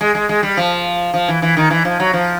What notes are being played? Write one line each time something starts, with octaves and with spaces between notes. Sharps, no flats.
G#3
G#3
G#3
G3
F3
F3
E3
E3
D#3
E3
F3
F#3
F3